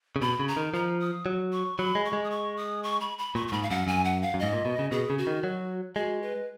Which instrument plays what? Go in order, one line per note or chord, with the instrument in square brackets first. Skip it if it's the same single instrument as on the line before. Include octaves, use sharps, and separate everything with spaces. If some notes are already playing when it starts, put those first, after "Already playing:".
[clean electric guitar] C#3
[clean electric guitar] B2 [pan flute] B5
[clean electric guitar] C#3
[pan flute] A#5
[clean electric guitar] D#3
[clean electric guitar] F3 [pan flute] A#5
[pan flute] D#6
[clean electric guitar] F#3
[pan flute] C#6
[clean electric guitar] F#3 [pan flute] B5
[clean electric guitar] G#3
[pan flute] C#6
[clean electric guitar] G#3
[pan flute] D#6
C#6
D#6
C#6
B5
B5
[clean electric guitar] A#2 [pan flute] C#6
[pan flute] C#6
[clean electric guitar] G#2 [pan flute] B5
[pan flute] F5
[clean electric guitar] F#2 [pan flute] F#5
[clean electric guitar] F#2 [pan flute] G#5
[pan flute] F#5
F5
[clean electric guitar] F#2
[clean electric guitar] G#2 [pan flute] D#5
[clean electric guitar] A#2
B2
C#3
[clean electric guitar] B2 [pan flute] G#4
[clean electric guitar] C#3
[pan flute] F#4
[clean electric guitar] D#3
F#3
[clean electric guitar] G#3 [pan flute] F#4
[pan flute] B4